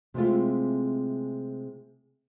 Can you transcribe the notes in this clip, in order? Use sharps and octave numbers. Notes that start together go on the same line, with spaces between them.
C3 G#3 A3 C4 E4 F4